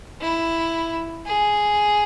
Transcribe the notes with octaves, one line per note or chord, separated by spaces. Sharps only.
E4
G#4